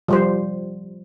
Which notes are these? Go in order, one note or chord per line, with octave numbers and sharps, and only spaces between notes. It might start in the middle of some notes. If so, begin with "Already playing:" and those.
F3 G3 C5